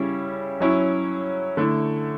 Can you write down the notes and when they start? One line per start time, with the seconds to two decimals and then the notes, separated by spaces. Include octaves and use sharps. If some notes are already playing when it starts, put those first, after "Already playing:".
Already playing: C#3 G3 C#4 E4
0.60 F#3 C#4 E4
1.57 D3 A3 E4